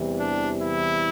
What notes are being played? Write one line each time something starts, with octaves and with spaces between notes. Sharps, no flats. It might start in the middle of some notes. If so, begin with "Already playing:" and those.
Already playing: E2 C3 E3 G3
D4
E4